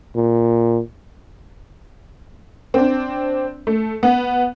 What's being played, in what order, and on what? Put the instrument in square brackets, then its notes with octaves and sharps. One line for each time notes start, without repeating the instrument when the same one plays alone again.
[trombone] A#2
[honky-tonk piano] C4 D4
A3
B3